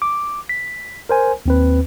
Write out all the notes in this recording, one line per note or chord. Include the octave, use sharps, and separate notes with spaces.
D6
B6
A#4 C5 G#5
D#2 C4 B4